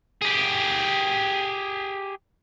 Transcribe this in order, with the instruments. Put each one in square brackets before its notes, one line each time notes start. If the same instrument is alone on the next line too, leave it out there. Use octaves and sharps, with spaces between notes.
[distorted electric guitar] G4 G#4